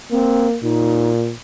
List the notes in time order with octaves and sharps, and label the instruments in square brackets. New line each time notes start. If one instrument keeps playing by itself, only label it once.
[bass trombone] A#3 [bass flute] C4
[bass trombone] A#2 [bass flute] D#4